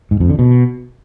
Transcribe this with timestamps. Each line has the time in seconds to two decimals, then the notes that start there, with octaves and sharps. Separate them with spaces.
0.11 G#2
0.20 F2
0.30 D3
0.39 B2